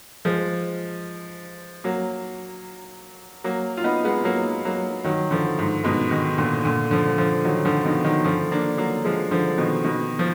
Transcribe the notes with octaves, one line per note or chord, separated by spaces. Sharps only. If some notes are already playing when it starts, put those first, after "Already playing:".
F3 G#3
F#3 A#3
F#3 A#3
F4
B3 D#4
G#3 B3
F#3 A#3
F#3 A#3
D#3 F#3
D3 F3
G#2
G#2 B2
B2 D#3
A#2 D3
A#2 D3
D3 F3
D3 F3
D#3 F#3
D3 F3
B2 D#3
D#3 F#3
D3 F3
A#3 D4
F#3 A#3
F3 G#3
D3 F3
B2 D#3
B2 D#3
F3